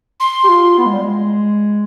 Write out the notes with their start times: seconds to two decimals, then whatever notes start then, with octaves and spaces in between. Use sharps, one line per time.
0.20 C6
0.44 G4
0.49 F4
0.78 B3
0.86 G#3
0.94 G3
1.02 G#3